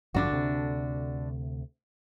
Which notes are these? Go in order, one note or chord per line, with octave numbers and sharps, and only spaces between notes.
A1 G2 D3 F3 D4 F#4
D2 C3